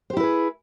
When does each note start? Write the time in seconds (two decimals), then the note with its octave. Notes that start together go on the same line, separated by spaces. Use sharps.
0.10 C5
0.13 G4
0.17 E4
0.20 B4
0.23 G#4